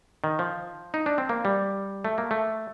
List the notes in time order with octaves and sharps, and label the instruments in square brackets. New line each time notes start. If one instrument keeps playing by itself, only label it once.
[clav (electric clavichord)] D#3
F3
D#4
D4
C4
A#3
G3
A3
A#3
A3